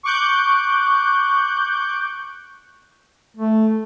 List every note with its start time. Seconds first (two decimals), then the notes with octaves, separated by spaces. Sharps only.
0.03 C#6 D6 F#6 G6
3.37 A3